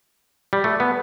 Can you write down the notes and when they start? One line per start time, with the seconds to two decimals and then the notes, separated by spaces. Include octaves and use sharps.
0.53 G3
0.64 A3
0.80 B3